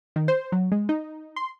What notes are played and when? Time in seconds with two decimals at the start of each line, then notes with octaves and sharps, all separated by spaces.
0.16 D#3
0.28 C5
0.52 F#3
0.72 G#3
0.89 D#4
1.36 C6